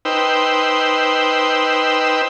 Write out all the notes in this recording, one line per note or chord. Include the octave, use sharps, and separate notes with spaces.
D#4 B4 C5 G5 E6